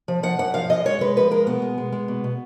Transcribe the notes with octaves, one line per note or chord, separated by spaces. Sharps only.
F3
F3 F#5
F#2 F#5
F3 F5
F#2 D#5
G#3 C#5
G#3 B4
F3 B4
G#3 A#4
B2 B3
G#3
G#3
G#3
B2
B2